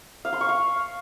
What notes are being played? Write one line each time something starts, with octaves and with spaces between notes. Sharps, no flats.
F5
C6
C#6
F5